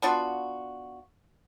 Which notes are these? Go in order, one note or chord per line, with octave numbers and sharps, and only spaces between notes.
B3 D4 F4 F#4